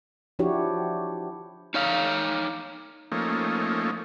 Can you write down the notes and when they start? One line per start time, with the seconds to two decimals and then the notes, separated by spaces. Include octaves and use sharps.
0.39 F3 D4 E4 F#4 G4 C#5
1.74 D#4 C#5 F5
3.12 F3 A3 A#3 C#4 D#4